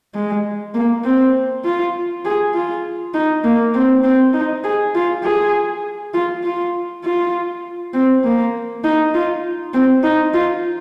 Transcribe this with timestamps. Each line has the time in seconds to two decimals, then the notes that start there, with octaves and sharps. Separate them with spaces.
0.14 G#3
0.74 A#3
1.05 C4
1.65 F4
2.25 G#4
2.54 F4
3.14 D#4
3.44 A#3
3.74 C4
4.04 C4
4.34 D#4
4.64 G#4
4.95 F4
5.24 G#4
6.14 F4
6.43 F4
7.04 F4
7.93 C4
8.24 A#3
8.84 D#4
9.14 F4
9.74 C4
10.03 D#4
10.34 F4